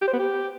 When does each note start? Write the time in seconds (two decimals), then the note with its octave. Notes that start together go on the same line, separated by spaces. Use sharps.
0.02 G4
0.08 C5
0.13 B3
0.19 G4